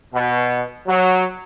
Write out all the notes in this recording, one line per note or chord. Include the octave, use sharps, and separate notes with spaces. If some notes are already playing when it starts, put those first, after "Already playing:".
B2
F#3